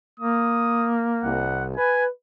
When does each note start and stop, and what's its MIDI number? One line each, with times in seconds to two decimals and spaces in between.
0.20 1.47 58
0.20 0.92 87
1.23 1.75 36
1.23 1.65 78
1.77 2.08 71
1.77 2.04 80